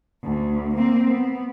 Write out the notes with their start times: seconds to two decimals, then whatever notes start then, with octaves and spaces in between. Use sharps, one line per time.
0.24 D2
0.76 A#3 C4
1.12 B3